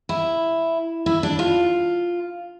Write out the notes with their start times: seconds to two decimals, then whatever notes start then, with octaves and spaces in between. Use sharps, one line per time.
0.09 E4
1.06 E4
1.23 D4
1.39 F4